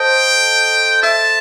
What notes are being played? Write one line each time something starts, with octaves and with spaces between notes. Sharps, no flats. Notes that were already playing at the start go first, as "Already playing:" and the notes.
Already playing: A4 C5 D#5 G5
E5 A5